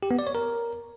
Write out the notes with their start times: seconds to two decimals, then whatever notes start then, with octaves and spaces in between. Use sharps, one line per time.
0.03 G4
0.11 B3
0.19 D5
0.27 C#5
0.35 A#4